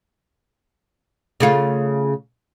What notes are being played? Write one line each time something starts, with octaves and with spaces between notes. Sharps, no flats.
C#3 A3 F4